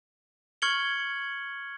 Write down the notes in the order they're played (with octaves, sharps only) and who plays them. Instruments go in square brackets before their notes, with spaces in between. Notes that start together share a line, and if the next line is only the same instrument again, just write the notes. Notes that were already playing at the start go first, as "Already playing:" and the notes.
[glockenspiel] C#6 F6 G#6 C#7 F#7 G7